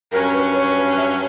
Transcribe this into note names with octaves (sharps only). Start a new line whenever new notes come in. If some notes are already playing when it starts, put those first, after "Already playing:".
G2 F#3 C#4 A#4
B4
C#5
B4
E5